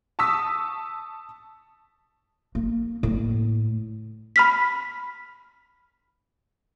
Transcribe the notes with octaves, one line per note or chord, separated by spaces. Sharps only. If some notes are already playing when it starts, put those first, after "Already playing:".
A5 C#6 D#6 E6 B6
A#3
A2
B5 F6 B6